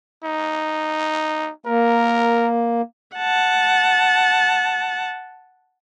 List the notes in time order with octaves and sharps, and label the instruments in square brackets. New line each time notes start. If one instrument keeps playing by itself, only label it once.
[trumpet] D#4
[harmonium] A#3 [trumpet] A#4
[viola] F#5 A5